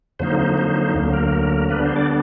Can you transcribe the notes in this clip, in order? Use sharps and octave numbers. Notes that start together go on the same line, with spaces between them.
F2 D3 F#3 A#3 D#4 C5
C5
D2 D3 F#3 A#3
A#4
D3 G3 B3 D4 B4
C5
D5